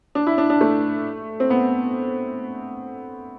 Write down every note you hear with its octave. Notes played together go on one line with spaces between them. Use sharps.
D4
E4
D4
D4
A3
C4
B3